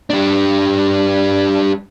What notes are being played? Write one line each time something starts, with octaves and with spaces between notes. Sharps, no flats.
G3 D4